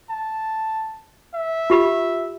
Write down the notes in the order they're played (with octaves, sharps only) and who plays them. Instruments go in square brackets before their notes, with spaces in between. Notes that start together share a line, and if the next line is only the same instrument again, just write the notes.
[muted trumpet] A5
E5
[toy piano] F4 G4 B5